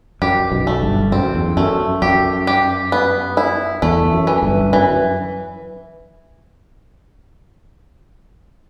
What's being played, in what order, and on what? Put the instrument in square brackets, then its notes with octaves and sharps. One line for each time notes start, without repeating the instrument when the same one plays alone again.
[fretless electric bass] F#2 [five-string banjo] G4
[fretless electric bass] B1 B2
[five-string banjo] A3
[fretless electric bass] G1 G2
[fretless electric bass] F#2 [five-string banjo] C4
[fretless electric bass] E2
[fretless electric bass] F#2 [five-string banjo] A3
[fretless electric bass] F#2 [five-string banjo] G4
[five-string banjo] G4
B3
E4
[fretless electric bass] E2 [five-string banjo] A3
[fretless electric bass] F#2
[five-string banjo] E3
[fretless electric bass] G1 G2
[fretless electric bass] F#2 [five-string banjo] E3